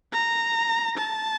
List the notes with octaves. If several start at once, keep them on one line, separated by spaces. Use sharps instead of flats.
A#5
A5